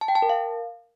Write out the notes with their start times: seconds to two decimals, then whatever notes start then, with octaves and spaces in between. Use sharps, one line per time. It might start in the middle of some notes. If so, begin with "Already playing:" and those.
0.01 A5
0.08 G5
0.15 A5
0.22 A#4
0.29 F5